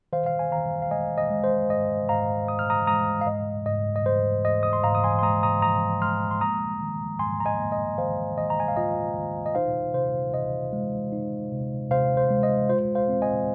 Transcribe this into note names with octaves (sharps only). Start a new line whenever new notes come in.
D#3 C5 F5
F5
G#5
D#3 F5 A#5
F5
G#3 D#5 G#5
D#5
G#3
C5
G#2 D#5
G#2 F5 A#5
G#2 D#6
F6
A#5 D#6
G#3 A#5 D#6
F5
G#2 D#5
G#2 D#5
D#5
G#2 C5
G#2 D#5
D#6
C6
G#2 F5 A#5
D#6
G#5 C6
C6
G#3 A#5 D#6
A#5 D#6
F3 A#5 D#6
G#3 C6 F6
C6
A#3 A#5 D#6
D#3
G#2 G#5 C6
A#5
D#5 G#5
A#3
D#5
D#3 C5 F5
D#3 D#5
A#5
G#5
F5
F4 D#5
D#3
D#5
D#4 C5 F5
C3 C5
C3 D#5
G#3
D#4
C3
C3 C5 F5
C5
G#3
D#5
F4 C5
C5 F5
C4
D#5 G#5